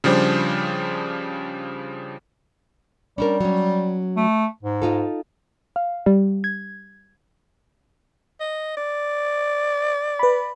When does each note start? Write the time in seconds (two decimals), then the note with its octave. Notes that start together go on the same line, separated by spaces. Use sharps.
0.04 C#3 F3 G3 D4 C5
3.18 G3 C#4 D4 A#4
3.40 F#3 C#4
4.17 A3
4.63 G#2
4.82 D#4 F4 A4
5.76 F5
6.06 G3
6.44 G#6
8.40 D#5
8.77 D5
10.19 B4 B5